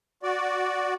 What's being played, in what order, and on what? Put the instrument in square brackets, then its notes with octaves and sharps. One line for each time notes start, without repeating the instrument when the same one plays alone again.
[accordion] F#4 D5